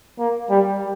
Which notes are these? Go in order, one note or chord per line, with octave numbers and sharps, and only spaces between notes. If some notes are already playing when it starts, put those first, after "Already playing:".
A#3
G3